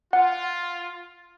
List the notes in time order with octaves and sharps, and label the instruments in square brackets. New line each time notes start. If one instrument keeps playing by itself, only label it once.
[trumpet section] F4 [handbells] F#5